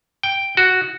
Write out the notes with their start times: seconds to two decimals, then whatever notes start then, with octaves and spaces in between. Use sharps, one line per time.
0.23 G5
0.57 F#4